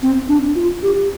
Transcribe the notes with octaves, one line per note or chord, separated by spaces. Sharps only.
C4
D4
F4
G4